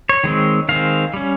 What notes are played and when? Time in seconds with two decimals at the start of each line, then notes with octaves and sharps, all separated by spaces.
0.09 C#5
0.24 D#3 G#3 C4
0.69 D#3 G#3 C4 F5
1.14 G3 C#4